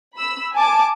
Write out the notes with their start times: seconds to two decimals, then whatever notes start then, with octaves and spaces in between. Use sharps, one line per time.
0.16 B5 E6
0.54 G#5 A5 D6